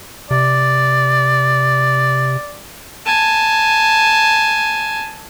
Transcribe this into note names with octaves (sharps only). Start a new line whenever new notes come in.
C3 D5
G#5 A5